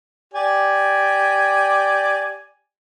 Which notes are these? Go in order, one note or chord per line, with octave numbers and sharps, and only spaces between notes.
G4 D5 G#5